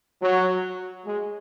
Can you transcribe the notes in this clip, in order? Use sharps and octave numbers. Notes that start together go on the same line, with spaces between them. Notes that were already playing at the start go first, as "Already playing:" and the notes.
F#3
G#3